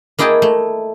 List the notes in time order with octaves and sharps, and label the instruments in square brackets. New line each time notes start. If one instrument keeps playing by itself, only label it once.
[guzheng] A#3 E4 G#4 D#5 G5 A5
A3